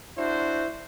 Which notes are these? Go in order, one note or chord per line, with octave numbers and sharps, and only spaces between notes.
D4 E4 F#4 C5